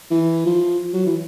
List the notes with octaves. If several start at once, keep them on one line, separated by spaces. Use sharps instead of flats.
E3
F3
F#3
E3